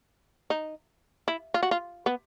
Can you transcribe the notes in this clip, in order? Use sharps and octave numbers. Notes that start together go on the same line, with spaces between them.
D#4
E4
F4
F#4
F4
B3